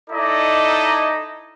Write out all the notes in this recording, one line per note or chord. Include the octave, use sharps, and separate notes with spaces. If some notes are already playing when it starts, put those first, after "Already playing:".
D#4 E4 A4 D5 D#5